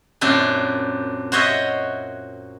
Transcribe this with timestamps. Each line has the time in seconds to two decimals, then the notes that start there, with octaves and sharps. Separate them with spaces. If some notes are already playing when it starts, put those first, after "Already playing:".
0.21 F#2 A#2 C4 D4
1.32 F#4 C5 C#5 D#5 E5